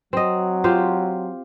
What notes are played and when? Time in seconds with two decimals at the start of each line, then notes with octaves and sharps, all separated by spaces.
0.13 F#3 C4 D#5
0.64 F4 G4 C5